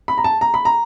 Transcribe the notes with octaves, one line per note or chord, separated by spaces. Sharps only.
B5
A#5
A5
A#5
B5
A#5